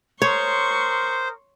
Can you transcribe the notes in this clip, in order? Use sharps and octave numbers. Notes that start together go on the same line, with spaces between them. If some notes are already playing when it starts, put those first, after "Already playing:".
A#4 C5 C#5 C6 C#6 D#6